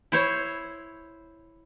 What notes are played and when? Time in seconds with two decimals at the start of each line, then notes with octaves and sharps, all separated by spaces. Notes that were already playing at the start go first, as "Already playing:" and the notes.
0.12 E4 C5 C#5